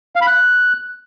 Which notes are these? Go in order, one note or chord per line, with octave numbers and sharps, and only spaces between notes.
F5
B5
F#6